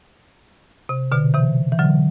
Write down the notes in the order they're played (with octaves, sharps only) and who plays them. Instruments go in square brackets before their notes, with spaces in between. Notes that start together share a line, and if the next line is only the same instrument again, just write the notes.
[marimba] C3
B2 D3
C3 E3
E3
D3 F#3